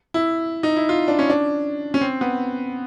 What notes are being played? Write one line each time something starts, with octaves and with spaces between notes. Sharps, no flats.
E4
D#4
E4
F4
D4
C#4
D4
C#4
C4
B3